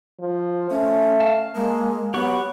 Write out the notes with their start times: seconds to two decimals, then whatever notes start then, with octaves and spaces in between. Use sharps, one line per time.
0.20 F3
0.70 A3 C#4
1.20 F5 A5
1.55 G#3 A#3
2.14 F#3 B3 G4 F#5 C#6